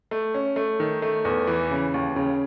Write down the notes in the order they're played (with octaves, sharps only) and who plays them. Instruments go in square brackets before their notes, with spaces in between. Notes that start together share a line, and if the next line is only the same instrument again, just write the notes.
[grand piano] A3
C#4
A3
D#3
A3
E2
E3
C#3
D#2
C#3